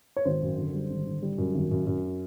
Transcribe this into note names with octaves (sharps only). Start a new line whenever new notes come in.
C#5
G#1 C5
F#2
D3
G3
G#1
D3
G3
F#2
G#1
F#2
F#2